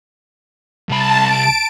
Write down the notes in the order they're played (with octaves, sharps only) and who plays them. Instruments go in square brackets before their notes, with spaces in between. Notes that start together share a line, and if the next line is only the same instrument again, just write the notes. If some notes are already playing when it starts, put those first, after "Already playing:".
[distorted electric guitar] C2 B5 [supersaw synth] A5
[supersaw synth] D7